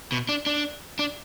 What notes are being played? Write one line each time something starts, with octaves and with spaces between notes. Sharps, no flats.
B2
D4
D4
D4